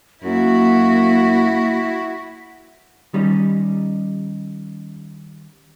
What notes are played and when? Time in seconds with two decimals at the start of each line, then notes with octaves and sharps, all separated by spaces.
0.24 F#2 A#3 E4 F#4
3.13 D#3 G3 C#4 D#4